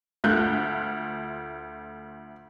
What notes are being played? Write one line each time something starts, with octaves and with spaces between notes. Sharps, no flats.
D2 A3 F4 F#6 G6